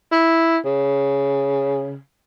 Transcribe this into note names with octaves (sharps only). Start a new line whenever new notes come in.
E4
C#3